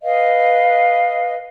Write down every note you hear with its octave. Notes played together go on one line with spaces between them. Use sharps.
B4 D#5 F5